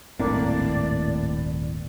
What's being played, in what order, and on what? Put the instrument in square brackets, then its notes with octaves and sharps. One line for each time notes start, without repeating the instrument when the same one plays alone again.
[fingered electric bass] D#1 G#1 C4 [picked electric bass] A2 [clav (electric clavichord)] A#3 D4 [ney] D5